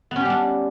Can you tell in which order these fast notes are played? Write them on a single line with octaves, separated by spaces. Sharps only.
B3 C#4 G4 G3 D4